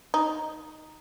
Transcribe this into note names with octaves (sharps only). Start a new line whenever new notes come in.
D#4